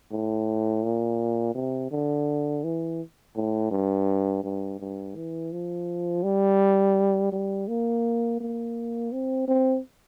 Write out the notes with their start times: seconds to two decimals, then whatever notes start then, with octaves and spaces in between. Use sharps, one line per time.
0.11 A2
0.84 A#2
1.55 C3
1.91 D3
2.64 E3
3.35 A2
3.71 G2
4.44 G2
4.80 G2
5.16 E3
5.52 F3
6.24 G3
7.32 G3
7.68 A#3
8.40 A#3
9.12 C4
9.48 C4